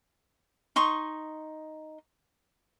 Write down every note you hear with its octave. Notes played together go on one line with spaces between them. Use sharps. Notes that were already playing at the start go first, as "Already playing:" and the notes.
D#4 C6 C#6 D#6